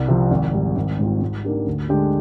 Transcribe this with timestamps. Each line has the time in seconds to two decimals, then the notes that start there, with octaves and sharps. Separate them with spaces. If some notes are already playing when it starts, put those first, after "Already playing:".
Already playing: C2
0.08 C3 F3
0.31 G#1
0.53 G#2 G3
0.76 G#1
0.98 G#2 G3 C4 F4
1.22 G#2
1.44 D#3 A#3 D4 G4
1.66 D2
1.89 D3 G#3 D4 G4